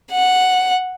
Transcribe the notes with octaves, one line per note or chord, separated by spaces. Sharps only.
F#5